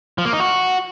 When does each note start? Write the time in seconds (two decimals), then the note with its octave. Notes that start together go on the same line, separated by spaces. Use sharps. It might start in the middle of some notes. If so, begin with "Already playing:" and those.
0.18 F3
0.25 A#3
0.33 D#4
0.40 F#4